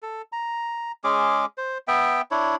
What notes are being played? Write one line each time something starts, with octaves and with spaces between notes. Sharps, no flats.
A4
A#5
G#3 C#4 G#4 D6
C5
B3 E5 G5
D4 E4 C#5